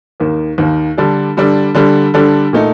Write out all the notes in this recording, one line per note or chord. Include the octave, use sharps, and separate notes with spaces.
D#2 D#3 A#3
D#2 D#3 A#3
D3 G3 D4 A4
D3 G3 D4 A4
D3 G3 D4 A4
D3 G3 D4 A4
A#2 A3 D#4